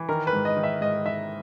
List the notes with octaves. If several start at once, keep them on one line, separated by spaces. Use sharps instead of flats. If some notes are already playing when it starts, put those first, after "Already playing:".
Already playing: E3
D#3 A#4
B4
G#2
D#5
D#3
E5
G#2 D#5
D#3 E5